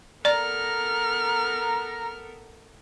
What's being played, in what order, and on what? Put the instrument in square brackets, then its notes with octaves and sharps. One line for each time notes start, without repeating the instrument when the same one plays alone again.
[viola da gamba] B3 A4 A#4 [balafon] D5 [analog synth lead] A#5 [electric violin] F6